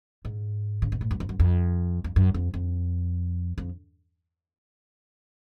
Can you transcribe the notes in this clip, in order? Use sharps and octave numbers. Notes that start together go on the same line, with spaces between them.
G#2
C#3
B2
A2
F#2
F2
F#2
F2
F2
F#2
F2
F2
F2